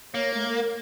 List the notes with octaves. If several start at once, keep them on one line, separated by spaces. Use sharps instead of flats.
A#3 C#5
A3
A#4